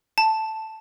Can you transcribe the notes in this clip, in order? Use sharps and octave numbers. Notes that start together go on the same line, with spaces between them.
A5